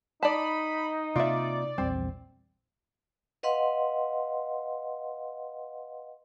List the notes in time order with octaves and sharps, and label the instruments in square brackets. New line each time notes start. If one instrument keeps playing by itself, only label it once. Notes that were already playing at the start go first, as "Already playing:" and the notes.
[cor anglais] D#4 [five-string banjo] D5 A5 [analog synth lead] B5
[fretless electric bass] C3 A#3 [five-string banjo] F4 E5 [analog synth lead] D5
[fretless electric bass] A#1 E2 G3 [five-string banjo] C4
[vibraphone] B4 D#5 F5 F#5 C6